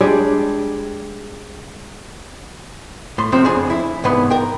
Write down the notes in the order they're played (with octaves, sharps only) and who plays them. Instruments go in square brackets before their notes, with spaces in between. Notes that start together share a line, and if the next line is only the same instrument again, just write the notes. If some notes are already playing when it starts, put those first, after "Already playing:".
[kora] G3 G#3 D4 G#4
[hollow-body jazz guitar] A2 C6
F#2 C3 F3 C4
F2 C#3 D4 G#4 G#5
E4
C2 G#2 E3 B3 B4 B5
A#4 G5